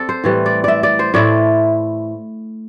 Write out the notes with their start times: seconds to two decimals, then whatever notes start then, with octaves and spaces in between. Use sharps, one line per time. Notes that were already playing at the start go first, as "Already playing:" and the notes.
Already playing: C4 A4 D5
0.09 C5
0.24 A2 E3 G3
0.46 D5
0.64 D5 E5
0.83 D5
0.99 C5
1.14 A2 A3 E4 D5